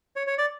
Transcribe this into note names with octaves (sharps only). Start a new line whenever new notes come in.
C#5
C#5
D5